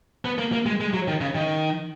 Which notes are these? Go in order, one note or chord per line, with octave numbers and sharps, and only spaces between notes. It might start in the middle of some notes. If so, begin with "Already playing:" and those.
B3
A#3
A#3
G#3
G#3
F#3
D#3
C#3
D#3